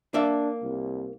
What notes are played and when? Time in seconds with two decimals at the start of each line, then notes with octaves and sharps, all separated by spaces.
0.14 A#3 D4 E5
0.63 C2